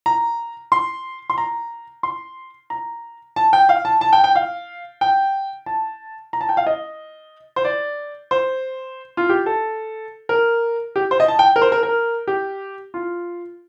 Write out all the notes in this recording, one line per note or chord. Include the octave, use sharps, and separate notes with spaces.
A#5
C6
C6
A#5
C6
A#5
A5
G5
F5
A5
A5
G5
G5
F5
G5
A5
A#5
A5
G5
F5
D#5
C5
D5
C5
F4
G4
A4
A#4
G4
C5
D#5
A5
G5
A#4
C5
A#4
A#4
G4
F4